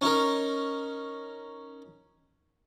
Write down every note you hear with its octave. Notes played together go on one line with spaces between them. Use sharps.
C#4 D#4 A#4